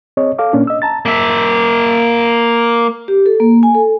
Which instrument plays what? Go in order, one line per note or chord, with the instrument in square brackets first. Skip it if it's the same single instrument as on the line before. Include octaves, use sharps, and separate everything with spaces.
[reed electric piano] C4 G#4 C#5 D#5
A4 F5 D6
A#2 A#3 C#4 D4
D#5 E6
A5 A#5 A6
[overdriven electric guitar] A#3 E5
[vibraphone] G4
A4
A#3
G#5
A4